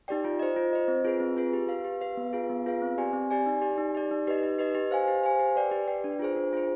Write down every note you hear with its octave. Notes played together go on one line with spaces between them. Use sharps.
D#4 G4 D5 G5
F4
C5 D#5
F4
C5 D#5
C4
F4 G#4 B4
C4
F4 G#4 B4
G4
B4 F5
G4
B4 F5
B3
F4 G#4 B4 F5
B3
F4 G#4 B4 F5
C4
G4 D5 G#5
C4
G4 D5 G#5
D#4
G4 D5
D#4
G4 D5
D#4
G4 B4 D#5
D#4
G4 B4 D#5
G4
C5 F5 G#5
G4
C5 F5 G#5
G4
B4 D5 G5
G4
B4 D5 G5
D4
F4 G#4 C5
D4
F4 G#4 C5